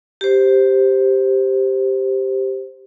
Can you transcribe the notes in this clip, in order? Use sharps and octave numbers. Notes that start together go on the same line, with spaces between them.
G4 C5